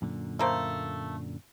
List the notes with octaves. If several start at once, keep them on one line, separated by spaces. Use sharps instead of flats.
F#2 A#2 D3
A3 A#3 C5